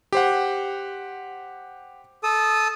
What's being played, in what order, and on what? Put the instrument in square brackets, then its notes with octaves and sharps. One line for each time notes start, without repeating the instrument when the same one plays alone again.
[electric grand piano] G4 C5 F#5
[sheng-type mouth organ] A4 D#6